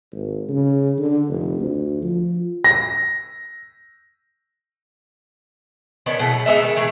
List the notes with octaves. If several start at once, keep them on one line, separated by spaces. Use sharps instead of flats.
G#1
C#3
D3
F1
D2
F3
A#6
D#3 B3 C#4 D4
B2 E3 A3 G#4
F#3
G#3 B3 D#4 E5
D#3
E3 A3 G#4